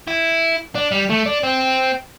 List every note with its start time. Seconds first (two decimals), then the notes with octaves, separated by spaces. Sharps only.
0.08 E4
0.75 D4
0.91 G3
1.10 A3
1.26 D4
1.43 C4